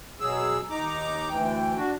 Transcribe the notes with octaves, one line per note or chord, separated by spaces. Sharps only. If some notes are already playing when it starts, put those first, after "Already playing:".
B2 F#3 G#4 E6
D#2 D#4 A#5 D6
D2 E3 G5
D4 F#4